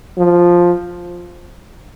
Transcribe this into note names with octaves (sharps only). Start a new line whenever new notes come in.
F3